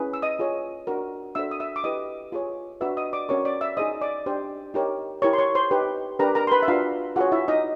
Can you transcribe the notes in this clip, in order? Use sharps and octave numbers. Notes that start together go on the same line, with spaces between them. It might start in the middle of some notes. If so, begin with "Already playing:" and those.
Already playing: C#4 E4 G#4 B4
E6
D#5 D#6
F4 G#4 C#5
D4 F#4 A#4
D4 F#4 A4 C5 E5 E6
D#6
E5 E6
D6
E4 G4 B4 D#5 D#6
F4 G#4 C#5
D4 F#4 B4 E5 E6
D#5 D#6
D5 D6
C#4 F#4 A#4 C#5 C#6
D5 D6
E5 E6
D#4 G#4 C5 D#5 D#6
D5 D6
D4 G4 C5
D#4 G4 A#4 C#5
E4 G4 A#4 C#5 C#6
C6
C#5 C#6
C5 C6
D#4 G4 B4
D4 G4 A#4 B4 A#5
A#4 A#5
C6
B4 B5
E5
D4 F4 F#4 B4 F5
F4 F#4 G#4 C#5 F#5
E4 E5
D#4 D#5